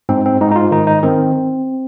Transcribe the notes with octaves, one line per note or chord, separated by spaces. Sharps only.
G#2 C4
C4
G#2 D#4
D#4
F4
D#3 D#4
D#4
D#3 C4